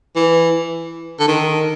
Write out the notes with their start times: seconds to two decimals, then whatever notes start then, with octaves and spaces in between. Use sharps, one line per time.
0.16 E3
1.20 D3
1.28 D#3